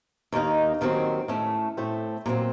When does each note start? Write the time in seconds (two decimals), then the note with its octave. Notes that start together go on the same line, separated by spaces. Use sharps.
0.32 D#2 D#3 A#3 D#4
0.81 D#2 D#3 F#3 C4
1.28 A2 A3 C#4
1.77 A2 A3 C4
2.26 A#2 F#3 C4